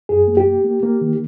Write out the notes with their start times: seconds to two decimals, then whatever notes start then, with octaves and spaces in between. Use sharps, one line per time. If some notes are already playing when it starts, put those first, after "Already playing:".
0.09 F#2 G#4
0.28 A#3
0.37 G4
0.46 A#3
0.65 A#3
0.83 A#3
1.01 D#3